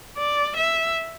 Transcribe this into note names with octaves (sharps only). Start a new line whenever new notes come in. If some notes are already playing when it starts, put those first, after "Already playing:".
D5
E5